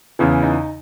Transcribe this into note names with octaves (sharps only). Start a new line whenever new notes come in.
E2 C#3 E3
D#4